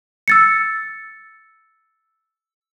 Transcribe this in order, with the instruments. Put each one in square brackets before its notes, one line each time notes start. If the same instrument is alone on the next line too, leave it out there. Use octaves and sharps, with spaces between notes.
[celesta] E6 A6 C#7